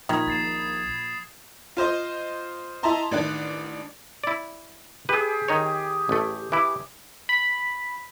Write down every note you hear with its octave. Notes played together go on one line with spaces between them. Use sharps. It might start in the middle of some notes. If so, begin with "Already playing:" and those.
A#2 D#3 F3 B5 D#6 G#6
A#1 A6 C7 E7
F4 C5 D#5
E4 D#5 E5 A5 A#5 C6
A1 D#3 D4 D5 F#6
E4 D5
G4 G#4 B4
D#3 D#4 C#5
A1 A3
E3 E4 D6
B5